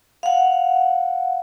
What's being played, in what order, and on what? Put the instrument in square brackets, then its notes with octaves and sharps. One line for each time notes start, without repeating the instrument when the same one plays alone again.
[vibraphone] F5 F#5